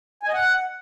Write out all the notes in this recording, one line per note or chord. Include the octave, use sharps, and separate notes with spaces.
G#5
D#5
F#5